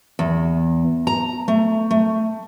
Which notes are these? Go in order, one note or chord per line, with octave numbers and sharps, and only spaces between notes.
E2
A#5
A3
A3